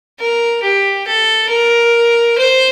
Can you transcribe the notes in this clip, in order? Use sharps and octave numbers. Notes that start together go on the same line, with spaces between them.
A#4
G4
A4
A#4
C5